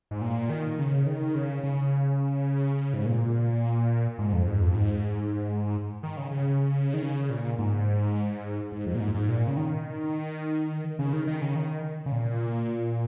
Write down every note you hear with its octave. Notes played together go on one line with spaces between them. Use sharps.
G#2
A#2
D#3
C#3
D#3
C#3
C#3
G#2
A#2
G#2
F2
G#2
F2
G#2
D#3
C#3
C#3
D#3
C#3
A#2
G#2
G#2
F2
A#2
G#2
G#2
A#2
C#3
D#3
C#3
D#3
D#3
C#3
D#3
C#3
A#2